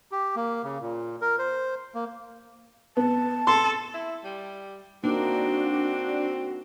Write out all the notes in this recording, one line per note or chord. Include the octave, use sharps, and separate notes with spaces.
G4
A#3
C#3
A#2
A#4
C5
A#3
B3 A5
A4 C6
E4
G3
A#3 C4 D4 D#4 F#4